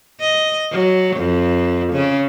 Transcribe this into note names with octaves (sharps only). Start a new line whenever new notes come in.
D#5
F#3
F2
C#3